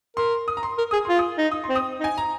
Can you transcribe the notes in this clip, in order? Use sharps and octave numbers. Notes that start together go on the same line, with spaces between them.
A#4 C6
D#6
A#5
C6
A#4
G#4 D#6
F4 C6
D#6
D#4
D#6
C6
C4
D#6
D#4
G#5
A#5